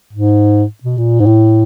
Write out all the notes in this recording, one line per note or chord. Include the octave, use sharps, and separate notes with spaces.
G#2
B2
A#2
G#2
A2